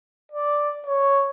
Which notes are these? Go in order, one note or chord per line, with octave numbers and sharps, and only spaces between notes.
D5
C#5